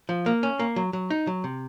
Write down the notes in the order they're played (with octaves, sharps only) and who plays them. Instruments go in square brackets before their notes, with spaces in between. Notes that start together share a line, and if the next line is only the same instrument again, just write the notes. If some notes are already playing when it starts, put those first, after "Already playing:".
[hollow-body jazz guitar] F3
A#3
C#4
A#3
F#3
F#3
D#4
F#3
C3